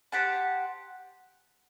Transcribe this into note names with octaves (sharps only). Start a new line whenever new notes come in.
G4 C5 F#5 A5